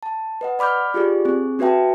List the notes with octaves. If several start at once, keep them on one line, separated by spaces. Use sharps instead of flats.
A5
B4 D#5 F#5
D5 B5 D6 F6 G6
F4 G4 G#4 D5
C4 G#4
C#4 F#4 B4 E5 G5 A5